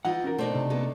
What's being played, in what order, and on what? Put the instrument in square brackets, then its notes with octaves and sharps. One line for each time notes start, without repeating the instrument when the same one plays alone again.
[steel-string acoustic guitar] E3 D#4 F4 [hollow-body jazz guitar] F#5
[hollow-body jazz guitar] C#4 F#4 A#4
[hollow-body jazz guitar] B2 [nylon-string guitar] A3 D4 D#4 [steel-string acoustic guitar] C5
[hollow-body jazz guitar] C3
[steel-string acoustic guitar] A#3 B3 A4